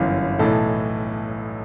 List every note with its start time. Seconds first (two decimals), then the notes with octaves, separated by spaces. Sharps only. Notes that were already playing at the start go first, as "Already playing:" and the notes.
Already playing: G1 F#2 E3
0.39 B1 A2 E3 A4